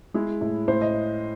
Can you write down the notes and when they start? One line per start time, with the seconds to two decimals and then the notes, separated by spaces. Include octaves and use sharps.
0.14 G#3 E4
0.41 A2
0.68 A2 C5
0.81 D#5